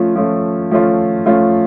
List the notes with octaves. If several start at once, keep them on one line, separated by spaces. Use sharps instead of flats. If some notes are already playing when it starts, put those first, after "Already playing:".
Already playing: F3 A3 C#4 F4
F3 A3 C#4 F4
F3 A3 C#4 F4
F3 A3 C#4 F4